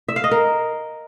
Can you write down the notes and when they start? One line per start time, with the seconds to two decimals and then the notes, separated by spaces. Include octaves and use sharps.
0.08 E5
0.16 F5
0.24 D#5
0.31 A#4